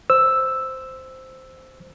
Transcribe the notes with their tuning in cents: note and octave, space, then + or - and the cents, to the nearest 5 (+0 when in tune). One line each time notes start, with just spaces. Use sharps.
C5 -5 E6 +0